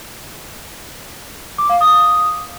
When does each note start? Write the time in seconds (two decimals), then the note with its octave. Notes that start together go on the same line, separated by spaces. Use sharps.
1.58 D6
1.70 F5
1.81 D#6